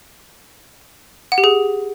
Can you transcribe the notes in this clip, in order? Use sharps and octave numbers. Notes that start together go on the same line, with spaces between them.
F#5
G4
G#4